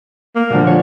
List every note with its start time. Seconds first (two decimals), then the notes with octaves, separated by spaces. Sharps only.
0.36 A#3
0.50 A#2 D3 F3
0.67 C#5